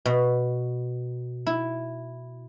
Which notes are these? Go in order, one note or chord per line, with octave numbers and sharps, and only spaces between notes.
B2
E4